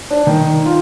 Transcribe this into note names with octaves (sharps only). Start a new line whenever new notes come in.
D4
D#3
F4